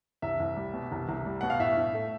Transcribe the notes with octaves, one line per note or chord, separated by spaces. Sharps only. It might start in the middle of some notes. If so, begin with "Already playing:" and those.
C2 E5
C2
G3
B2
C2
C2
G3
B2 F#5
F5
A2 E5
A2
A3